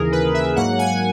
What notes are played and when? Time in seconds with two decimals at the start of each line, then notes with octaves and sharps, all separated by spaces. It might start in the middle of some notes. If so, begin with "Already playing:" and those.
Already playing: D#2 C#3 E3 G#4 A#4
0.12 B4
0.34 E5
0.56 G#2 F#3 A#3 F#5
0.79 G#5